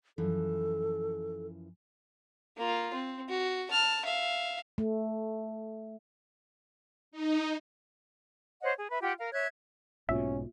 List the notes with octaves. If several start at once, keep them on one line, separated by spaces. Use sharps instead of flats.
F#2 E3 F3 A4
A#3 F4
C4
F#4
A5 F6
E5 F5
A3
D#4
C5 C#5 D#5 F#5
G#4
B4 E5
F4 G4 F#5 G5
A#4 F5
C#5 E5 F#6 G#6
B1 G#2 B2 A#3 C#4 F4 F#4 E5